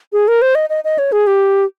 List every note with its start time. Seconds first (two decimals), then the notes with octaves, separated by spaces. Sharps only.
0.13 G#4
0.28 A#4
0.42 C5
0.55 D#5
0.70 D#5
0.84 D#5
0.98 C#5
1.12 G#4
1.27 G4